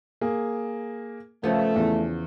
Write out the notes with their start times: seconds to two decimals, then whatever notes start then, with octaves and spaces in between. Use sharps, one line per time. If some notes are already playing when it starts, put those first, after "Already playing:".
0.21 A#3 G#4
1.44 C#3 F3 A3 B3
1.76 E2